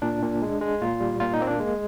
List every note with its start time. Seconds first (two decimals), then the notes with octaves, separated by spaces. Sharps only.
0.02 A#2 D4
0.22 A#2
0.42 G#3
0.61 G#3
0.81 A#2 F4
1.00 G3
1.20 A#2 F4
1.33 D#4
1.40 A#3 C4
1.47 D4
1.60 G#3